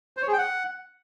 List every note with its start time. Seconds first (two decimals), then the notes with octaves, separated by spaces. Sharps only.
0.17 C5
0.22 C#5
0.27 G#4
0.33 G5
0.38 F#5